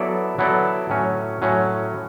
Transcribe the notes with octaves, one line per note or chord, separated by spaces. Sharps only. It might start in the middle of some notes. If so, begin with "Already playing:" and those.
Already playing: F#3 B3 E4 A4 D5
F#3 B3 E4 A4 D5
A2 F#3 C#4
A2 F#3 C#4